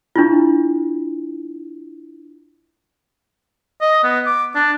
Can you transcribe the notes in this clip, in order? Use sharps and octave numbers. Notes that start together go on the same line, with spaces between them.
D4 E4 F4
D#5
B3
D6
D4